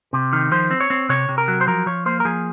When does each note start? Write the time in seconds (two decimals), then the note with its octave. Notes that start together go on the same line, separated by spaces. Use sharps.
0.13 C3
0.33 D#3
0.51 F3 C5
0.71 C4
0.81 C#5
0.90 C4
1.09 C3 C#5
1.29 C3
1.38 A#4
1.48 F#3
1.61 C5
1.67 F3 A#4
1.86 F3 C#5
2.06 A#3 C5
2.20 A#4
2.25 F3 G#4